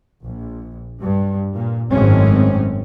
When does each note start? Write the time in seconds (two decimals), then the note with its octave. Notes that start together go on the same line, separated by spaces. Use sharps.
0.24 A#1
1.02 G2
1.53 A#2
1.90 G#1 F#2 A2 G#3 C4 C#4